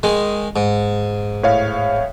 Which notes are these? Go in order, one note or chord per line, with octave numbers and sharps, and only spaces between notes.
D#3 G#3
G#2
A2 C#5 F5